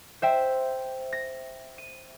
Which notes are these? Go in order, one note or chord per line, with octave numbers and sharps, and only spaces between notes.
C5 E5 G5
A#6
D#7